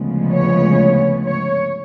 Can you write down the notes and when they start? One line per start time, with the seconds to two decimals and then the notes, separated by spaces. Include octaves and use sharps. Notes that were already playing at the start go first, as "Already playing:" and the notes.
Already playing: D2 C#3 F3 G#3 B3
0.31 C#5
1.24 C#5